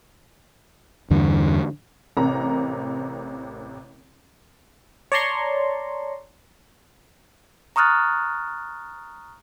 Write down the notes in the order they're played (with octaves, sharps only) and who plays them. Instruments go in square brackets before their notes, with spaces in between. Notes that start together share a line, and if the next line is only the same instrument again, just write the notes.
[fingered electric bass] E2 G2 D3
[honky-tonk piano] A1 C3 A#4 A#5
[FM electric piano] C#5 D5 A5 A#5 C6 C#6
[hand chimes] A#5 C#6 D#6 F6 F#6 A6